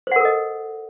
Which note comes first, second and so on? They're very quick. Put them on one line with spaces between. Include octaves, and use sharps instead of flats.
C5 F#5 A#4 A4 D#5